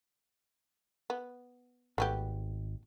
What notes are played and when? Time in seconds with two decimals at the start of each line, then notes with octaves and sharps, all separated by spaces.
1.10 B3
1.98 G#1 A3 B3 G4